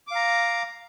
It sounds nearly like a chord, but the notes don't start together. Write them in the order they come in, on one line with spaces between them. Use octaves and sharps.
D6 F5 A#5